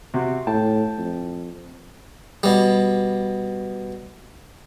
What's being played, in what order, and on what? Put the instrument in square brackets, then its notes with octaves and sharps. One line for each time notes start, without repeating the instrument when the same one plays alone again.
[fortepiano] C3 F#4 G4
[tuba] A2 [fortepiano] G5 A5
[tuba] F2
[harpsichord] B2 G3